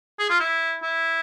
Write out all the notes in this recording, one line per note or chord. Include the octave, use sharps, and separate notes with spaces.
G#4
F4
E4
E4